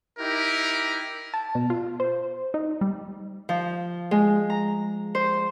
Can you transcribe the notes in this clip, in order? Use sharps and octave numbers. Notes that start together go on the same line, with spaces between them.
D#4 E4 G4 A#4
A5
B2
F4
C5
D#4
G3
F3
G#3
A#5
C5